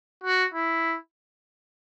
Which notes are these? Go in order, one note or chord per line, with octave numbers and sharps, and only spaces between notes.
F#4
E4